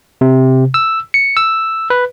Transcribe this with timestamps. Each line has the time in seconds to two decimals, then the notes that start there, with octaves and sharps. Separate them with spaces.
0.21 C3
0.74 E6
1.14 C#7
1.37 E6
1.90 B4